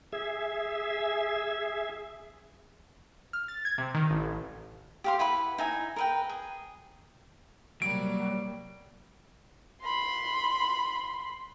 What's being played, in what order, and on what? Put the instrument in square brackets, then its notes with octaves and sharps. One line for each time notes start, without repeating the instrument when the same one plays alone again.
[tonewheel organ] G#4 E5
[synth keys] F6
A6
G#6
C3
D#3
A1
[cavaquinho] G4 F5 C6
E4 B4 F#5 B5
D#4 E4 G#5
A#4 B4 G5
G#4
[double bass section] C3 A#3 [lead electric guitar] F#3 [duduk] G3 [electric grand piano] D7
[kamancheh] B5 C6